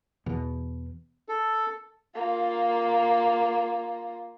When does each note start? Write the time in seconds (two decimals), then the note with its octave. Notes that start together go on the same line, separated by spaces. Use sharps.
0.26 E2 B2
1.29 A4
2.15 A#3 F4